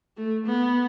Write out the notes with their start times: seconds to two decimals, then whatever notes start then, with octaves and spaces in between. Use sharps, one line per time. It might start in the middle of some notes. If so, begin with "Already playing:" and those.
0.17 A3
0.46 B3